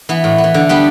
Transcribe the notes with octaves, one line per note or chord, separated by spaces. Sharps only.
E3 B3
A2
B3
E3
D3
G3 B3 D4